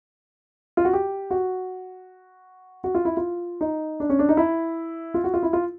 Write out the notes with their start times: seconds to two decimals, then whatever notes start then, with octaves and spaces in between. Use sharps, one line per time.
0.77 F4
0.85 F#4
0.93 G4
1.31 F#4
2.84 F#4
2.95 F4
3.05 E4
3.17 F4
3.61 D#4
4.00 D4
4.10 C#4
4.19 D4
4.29 D#4
4.37 E4
5.14 F4
5.24 F#4
5.34 F4
5.43 E4
5.53 F4